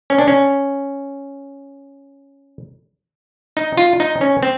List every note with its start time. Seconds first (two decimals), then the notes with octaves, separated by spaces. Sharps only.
0.10 C#4
0.18 D4
0.28 C#4
3.57 D#4
3.78 F4
4.00 D#4
4.21 C#4
4.43 C4